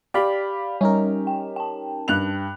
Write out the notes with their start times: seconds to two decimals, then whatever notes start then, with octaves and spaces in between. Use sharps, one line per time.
0.14 G4 D5 F5 B5
0.81 G3 C#4 D#4 A#4
1.27 G5
1.56 G5 A5
2.08 G2 F#6 F7